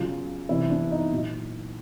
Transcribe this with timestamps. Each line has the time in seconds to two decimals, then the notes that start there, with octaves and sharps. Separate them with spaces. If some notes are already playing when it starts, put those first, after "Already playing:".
Already playing: C#3 F#3 F4
0.49 C3 E3 E4
0.70 D4
0.91 D#4
1.12 A#2 F#3